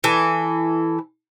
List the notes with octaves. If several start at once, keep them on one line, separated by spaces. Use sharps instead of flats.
E3 A4